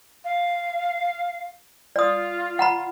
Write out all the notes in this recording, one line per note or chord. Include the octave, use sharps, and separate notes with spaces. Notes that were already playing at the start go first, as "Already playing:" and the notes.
F5
F4 D5 D#6
F#5 A#5 B5